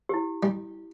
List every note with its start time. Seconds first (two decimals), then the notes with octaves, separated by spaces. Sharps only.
0.09 E4 G4
0.43 G3